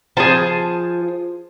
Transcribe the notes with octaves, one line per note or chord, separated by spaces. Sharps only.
F3 G#4 A5